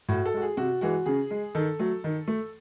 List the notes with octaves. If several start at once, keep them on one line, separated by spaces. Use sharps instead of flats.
A2 F#4
A4
G#3 F#4
G#4
C3 F#4
E3 G#3 F#4
C#3 G#4
G#3
D#3 A4
F#3 A3
D#3
A3